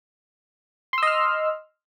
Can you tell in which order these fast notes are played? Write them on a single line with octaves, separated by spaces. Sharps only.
C6 E6 D#5 F6